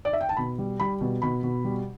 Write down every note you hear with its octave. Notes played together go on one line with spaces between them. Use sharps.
D5
E5
G5
A5
B2 B5
G3
G3 B5
B2
B2 B5
B2
G3